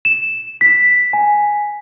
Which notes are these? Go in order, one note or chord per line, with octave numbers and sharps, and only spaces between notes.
E7
B6
G#5